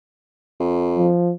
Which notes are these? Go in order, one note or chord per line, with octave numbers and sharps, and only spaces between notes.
F2
F3